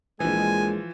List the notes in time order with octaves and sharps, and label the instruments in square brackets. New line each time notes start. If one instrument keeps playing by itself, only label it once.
[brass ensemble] A#1 G#3 [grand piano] E3 F3 [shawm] G#5